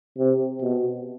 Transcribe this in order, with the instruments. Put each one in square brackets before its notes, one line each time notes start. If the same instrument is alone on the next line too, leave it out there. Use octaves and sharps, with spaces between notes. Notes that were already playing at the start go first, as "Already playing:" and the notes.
[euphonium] C3
B2